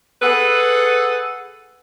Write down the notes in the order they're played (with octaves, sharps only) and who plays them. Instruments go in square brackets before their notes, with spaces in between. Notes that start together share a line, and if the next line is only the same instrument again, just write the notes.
[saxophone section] G#4 A4 B4 F#5